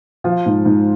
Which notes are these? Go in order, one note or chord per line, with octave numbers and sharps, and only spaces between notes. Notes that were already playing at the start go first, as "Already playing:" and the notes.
F3 F4
G#2
G#2